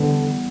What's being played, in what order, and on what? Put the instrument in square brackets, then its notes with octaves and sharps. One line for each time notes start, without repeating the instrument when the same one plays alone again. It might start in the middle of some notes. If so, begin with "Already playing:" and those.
Already playing: [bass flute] D3 [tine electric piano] E3 G3 B3